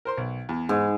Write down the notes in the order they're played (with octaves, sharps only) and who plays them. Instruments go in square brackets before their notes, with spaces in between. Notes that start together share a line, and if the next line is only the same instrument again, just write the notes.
[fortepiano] A#4 C5 C6
B1
E2
[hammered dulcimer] G#2